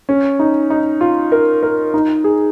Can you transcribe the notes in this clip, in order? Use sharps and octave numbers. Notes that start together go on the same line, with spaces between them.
C#4
D#4
D#4
F4
A#4
A#4
D#4
G#4